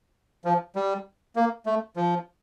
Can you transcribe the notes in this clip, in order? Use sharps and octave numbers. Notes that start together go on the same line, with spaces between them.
F3
G3
A#3
A3
F3